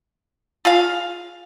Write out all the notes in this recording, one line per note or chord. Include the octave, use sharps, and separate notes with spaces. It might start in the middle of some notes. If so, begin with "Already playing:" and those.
F4 G#4 F5